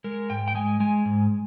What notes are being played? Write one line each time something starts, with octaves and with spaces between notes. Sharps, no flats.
G#3 A#4
G#2 G5
G5
G#3 G#5
G#3 G#5
G#2